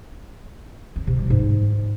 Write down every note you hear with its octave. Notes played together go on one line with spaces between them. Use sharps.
C4
C3
G3
G#2